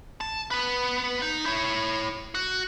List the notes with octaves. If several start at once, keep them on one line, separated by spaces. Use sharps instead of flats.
A5
B3 B4
D#4
E4 C#5
F#4